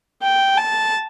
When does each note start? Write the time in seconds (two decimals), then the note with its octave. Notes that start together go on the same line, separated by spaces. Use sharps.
0.23 G5
0.58 A5